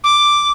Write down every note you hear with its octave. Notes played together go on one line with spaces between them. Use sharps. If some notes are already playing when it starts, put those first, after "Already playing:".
D6